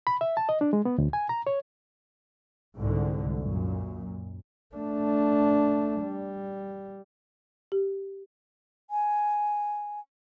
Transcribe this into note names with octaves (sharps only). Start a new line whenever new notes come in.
B5
E5
A5
D#5
D4
G#3
B3
D2
G#5
A#5
C#5
C2 G#2 D3
F#2 A#2
A3 D4
G3
G4
G#5